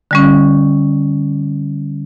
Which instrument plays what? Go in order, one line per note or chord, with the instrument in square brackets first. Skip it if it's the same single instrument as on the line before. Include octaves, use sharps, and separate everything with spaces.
[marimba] D3 G3 C#4